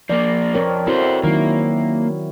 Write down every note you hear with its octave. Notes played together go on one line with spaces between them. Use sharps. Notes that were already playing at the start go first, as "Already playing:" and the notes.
F3 A#3 D5
F2 C4 A#4 C#5
C4 E4 F#4 A4 C5
D#3 F#3 A#3 E4